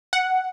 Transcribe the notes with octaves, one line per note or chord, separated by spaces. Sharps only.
F#5